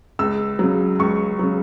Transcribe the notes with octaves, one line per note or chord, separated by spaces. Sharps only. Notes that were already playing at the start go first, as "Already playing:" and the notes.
C#2 E6
C#3 F#3
C#2 C#6
C#3 F#3